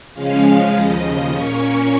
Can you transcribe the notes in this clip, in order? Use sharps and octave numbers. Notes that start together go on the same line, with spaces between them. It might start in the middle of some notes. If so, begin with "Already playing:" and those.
C#3 F3 G#3 C#4 F5
D#2 C#3 F3 D#5
A#2 A#3 C#4 C#5